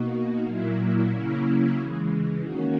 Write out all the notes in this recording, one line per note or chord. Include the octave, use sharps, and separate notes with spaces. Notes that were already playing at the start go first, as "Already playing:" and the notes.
Already playing: B2 A#3 D#4 F#4
A#2 F#3 A#3 E4
C#3 F#3 A#3 C#4 E4
C#3 E3 G#3
D#3 A#3 C#4 F#4